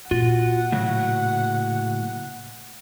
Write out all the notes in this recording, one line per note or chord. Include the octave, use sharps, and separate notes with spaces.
A#2 F4 F#4 F#5
A2 C#3 F#3